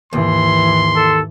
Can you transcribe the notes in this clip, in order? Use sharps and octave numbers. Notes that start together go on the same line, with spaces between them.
D#2 G#2 E3 C6
A4